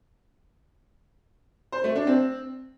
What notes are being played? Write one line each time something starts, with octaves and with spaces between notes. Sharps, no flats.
C5
A3
D4
C4